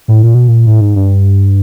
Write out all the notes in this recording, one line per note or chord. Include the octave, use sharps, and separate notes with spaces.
A2
A#2
B2
A#2
A2
G#2
G2